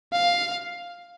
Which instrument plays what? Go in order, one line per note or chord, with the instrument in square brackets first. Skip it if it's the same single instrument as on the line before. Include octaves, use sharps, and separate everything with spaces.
[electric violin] F5